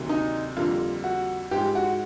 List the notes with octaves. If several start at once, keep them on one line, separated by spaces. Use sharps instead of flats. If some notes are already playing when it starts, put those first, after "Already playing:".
Already playing: D2 C3 D#3 F#3 A#3
D#4
F2 D3 G3 A#3 F4
F#4
G#2 F3 G#3 G4
F#4